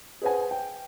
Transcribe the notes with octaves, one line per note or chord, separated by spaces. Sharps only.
G#4 B4 C5 F#5 G#5
G5